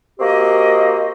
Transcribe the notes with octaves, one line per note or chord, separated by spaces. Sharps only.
A#3 C4 F#4 G4 D#5